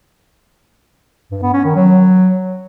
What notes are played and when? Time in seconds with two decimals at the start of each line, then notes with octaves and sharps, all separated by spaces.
1.31 G2
1.42 B3
1.54 C#4
1.65 D#3
1.76 F#3